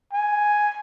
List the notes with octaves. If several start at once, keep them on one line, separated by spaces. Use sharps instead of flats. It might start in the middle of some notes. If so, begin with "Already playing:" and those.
G#5